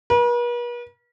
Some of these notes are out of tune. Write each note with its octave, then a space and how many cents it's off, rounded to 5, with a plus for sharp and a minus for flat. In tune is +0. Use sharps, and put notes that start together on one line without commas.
B4 -45